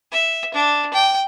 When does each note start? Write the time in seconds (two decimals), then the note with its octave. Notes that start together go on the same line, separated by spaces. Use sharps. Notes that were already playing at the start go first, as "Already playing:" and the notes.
0.12 E5
0.54 D4
0.93 G5